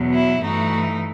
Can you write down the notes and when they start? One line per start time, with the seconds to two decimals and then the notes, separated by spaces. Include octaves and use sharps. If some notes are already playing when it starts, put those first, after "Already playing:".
Already playing: E2 B2 F#3
0.13 E4
0.43 G2 E3 A3 D#4 F#4